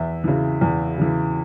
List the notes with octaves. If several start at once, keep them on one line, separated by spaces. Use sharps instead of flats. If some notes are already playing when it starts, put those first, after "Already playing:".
Already playing: E2 E5
C#3 E3
E2
C#3 E3